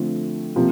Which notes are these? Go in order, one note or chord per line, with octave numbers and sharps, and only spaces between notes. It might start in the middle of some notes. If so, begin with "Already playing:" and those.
Already playing: D3 F3 A3 C4
C3 F3 A#3